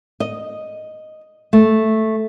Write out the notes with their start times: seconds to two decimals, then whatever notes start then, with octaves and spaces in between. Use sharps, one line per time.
0.20 D#5
1.53 A3